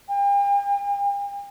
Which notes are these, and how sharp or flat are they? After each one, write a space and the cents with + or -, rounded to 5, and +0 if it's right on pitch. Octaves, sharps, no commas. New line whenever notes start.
G5 +45